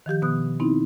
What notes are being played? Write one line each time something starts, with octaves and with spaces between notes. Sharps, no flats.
D#3 F3 G4 G6
B2 B3 D#6 F#6
B3 C4 D#4 E4